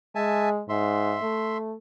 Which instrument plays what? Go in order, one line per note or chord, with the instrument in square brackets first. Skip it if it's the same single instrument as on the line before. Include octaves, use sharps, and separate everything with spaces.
[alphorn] G#3 [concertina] E5 G#5 A5
[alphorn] G#2 [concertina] E5 C6
[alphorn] A3